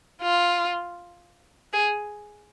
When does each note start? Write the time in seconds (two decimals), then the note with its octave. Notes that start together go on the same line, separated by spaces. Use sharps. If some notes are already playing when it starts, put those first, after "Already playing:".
0.22 F4
1.73 G#4